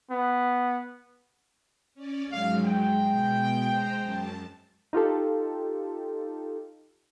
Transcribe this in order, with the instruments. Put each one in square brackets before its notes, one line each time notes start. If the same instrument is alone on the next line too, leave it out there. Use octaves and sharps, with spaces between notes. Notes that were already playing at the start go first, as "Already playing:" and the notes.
[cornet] B3
[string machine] C#4 D5
[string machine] G#2 F#3 [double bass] G#3 [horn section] F5
[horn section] G5
[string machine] B2
C5 A#5
F#2 A5
[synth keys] D#4 F4 G4 A4